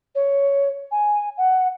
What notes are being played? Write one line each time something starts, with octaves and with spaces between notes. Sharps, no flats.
C#5
G#5
F#5